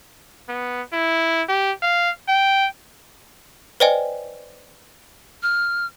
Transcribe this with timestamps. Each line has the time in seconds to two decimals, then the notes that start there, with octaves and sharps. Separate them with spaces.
0.49 B3
0.93 E4
1.48 G4
1.82 F5
2.28 G5
3.80 B4 C5 D5 D#5 G5 G#5
5.43 F6